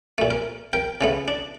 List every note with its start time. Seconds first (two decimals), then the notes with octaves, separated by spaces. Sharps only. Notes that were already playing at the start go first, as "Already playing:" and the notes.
0.18 A#2 A3
0.31 A#4
0.73 A#4 G5
1.01 C#3 A3 B3
1.28 D4